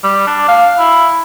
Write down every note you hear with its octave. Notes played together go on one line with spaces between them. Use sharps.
G3
D4
F5
E4